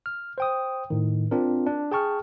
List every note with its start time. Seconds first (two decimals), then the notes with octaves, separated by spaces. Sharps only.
0.06 F6
0.38 C5 G5 D#6
0.90 A2 D#3
1.31 C4 D4 F4 A#4
1.66 D4
1.91 G#4 G5 A5 C#6 F6